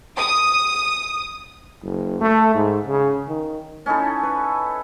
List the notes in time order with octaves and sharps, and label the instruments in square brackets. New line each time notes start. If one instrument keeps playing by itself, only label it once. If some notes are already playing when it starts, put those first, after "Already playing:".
[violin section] D#6
[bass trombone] F#1
A3
G#2
C#3
D#3
[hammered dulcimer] C#4 D#4 E4 A4
B4